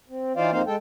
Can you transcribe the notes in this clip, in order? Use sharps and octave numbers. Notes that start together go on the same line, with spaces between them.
C4
E3 D#4 F4 C5 D5 F5
F2 A#3 C4 D#4 C5 F5
G#3 A4 G5